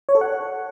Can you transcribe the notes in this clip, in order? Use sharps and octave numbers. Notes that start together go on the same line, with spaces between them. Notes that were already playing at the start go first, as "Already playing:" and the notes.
C#5
A4
F#5